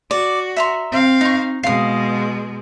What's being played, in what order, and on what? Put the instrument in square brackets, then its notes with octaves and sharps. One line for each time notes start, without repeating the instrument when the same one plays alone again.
[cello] F#4 [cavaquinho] D5
[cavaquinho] E5 A#5 C6
[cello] C4 F5
[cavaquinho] D#4 C#6
[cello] B2 G#3 [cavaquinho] F5 D#6